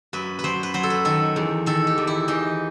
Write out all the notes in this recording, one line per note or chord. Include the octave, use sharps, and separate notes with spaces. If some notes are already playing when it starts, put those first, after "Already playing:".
F#2 B4
B4
F#2 C5
B4
F#3 C5
A4
B4
D#3 A4
E2
D#3 A4
G4
E2
E4
E3 D#4